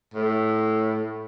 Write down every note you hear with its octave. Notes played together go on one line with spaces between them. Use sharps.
A2